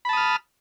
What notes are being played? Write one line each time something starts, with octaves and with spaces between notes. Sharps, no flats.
A5 B5 D#6 F6